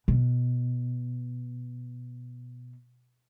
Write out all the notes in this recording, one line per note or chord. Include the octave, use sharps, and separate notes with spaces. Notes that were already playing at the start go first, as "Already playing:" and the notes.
B2